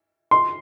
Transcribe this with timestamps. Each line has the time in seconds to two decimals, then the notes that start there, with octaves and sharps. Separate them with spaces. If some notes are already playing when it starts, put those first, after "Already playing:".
0.31 C6